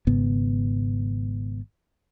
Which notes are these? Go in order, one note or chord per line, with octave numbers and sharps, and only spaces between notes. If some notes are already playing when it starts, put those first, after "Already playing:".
G#1 G#2 C#3 B3